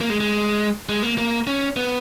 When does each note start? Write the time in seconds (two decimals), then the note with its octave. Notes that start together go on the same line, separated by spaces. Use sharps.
0.01 A#3
0.10 G#3
0.20 G#3
0.89 G#3
1.03 A#3
1.18 A#3
1.47 C#4
1.76 B3